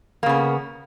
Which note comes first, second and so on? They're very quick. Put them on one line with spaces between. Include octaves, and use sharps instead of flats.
A#3 C#3 B3